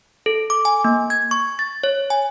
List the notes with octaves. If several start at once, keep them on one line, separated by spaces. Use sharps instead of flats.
A4
D6
G#5
A#3
G#6
C#6
A6
C#5
G#5